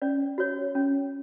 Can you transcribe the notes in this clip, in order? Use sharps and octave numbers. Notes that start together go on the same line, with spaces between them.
C#4 D5
F#4 C#5
C#4